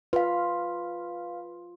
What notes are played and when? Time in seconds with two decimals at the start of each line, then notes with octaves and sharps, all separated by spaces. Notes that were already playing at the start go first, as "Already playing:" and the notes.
0.13 F4 B4 F5